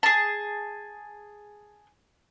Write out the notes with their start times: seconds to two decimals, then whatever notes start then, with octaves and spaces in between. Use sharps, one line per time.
0.03 G#4 A5